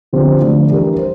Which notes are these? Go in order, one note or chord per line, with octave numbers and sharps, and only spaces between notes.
D3 F3 C4 G4 C5
D3 F3 A3 D4 F4
E3 G3 D4 G4 A#4
C5